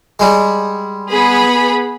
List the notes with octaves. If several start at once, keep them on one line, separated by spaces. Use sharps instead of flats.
G3 G#3
B3 G#4 B5